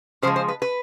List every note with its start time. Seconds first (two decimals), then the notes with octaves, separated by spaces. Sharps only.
0.22 C#3 F3 G#3 C5
0.36 C5
0.48 B4
0.62 B4